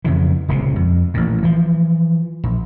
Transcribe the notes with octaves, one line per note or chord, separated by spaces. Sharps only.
F2 C#3 E3
D#1 C#2 C3 G#3
F2
A1 A#2
E3 F3
A#1